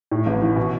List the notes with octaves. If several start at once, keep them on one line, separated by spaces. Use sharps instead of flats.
A2
A1
E3
B2